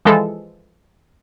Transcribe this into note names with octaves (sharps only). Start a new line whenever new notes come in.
E3 F3 G#3 A4